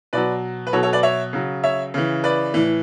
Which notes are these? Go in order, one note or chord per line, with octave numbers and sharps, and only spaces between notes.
B2 F#3 B4 D5
B4
B2 F#3 A4 C#5
A4 C#5
B4 D5
C#5 E5
C#3 F#3
C#5 E5
C#3 E3
B4 D5
A2 E3